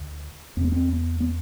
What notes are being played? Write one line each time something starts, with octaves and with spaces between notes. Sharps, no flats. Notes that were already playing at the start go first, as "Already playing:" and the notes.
Already playing: D2
E2 C3 C4
B3
C4
B3
B3